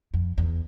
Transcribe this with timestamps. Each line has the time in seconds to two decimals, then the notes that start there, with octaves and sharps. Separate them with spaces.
0.14 F2
0.38 E2